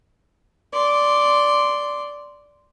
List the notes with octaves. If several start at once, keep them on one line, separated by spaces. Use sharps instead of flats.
D5 C6